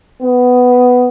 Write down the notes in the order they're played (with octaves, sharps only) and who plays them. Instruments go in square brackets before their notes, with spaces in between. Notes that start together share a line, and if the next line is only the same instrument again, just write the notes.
[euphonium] B3